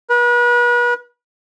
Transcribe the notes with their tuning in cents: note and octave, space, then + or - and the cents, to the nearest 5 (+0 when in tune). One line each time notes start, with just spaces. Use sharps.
B4 -35